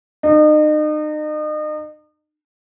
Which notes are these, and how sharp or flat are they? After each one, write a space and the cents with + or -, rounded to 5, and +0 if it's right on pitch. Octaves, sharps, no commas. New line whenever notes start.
D#4 -35